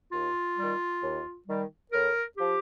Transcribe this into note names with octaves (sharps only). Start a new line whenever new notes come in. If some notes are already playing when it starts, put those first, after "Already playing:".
D#2 F4
D#3 G3
D#2
D#3 G3
A2 A#4
F3 G4